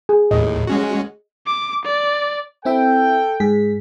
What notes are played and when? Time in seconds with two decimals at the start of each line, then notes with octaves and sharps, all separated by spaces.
0.09 G#4
0.31 D#2 A2 D#5
0.67 G#3 C#4 F#4
1.46 D6
1.85 D5
2.65 C4 E4 A4 E5 G5
3.40 G#2 G#4 B6